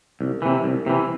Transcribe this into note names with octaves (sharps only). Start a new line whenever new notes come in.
C2
C3 E3
C2
C3 E3